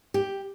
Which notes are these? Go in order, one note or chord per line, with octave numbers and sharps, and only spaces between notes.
G4